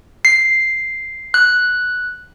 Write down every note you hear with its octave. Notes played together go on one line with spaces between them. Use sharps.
C7
F#6